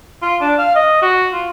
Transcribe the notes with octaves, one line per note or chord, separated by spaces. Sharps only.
F4
D4
F5
D#5
F#4
F4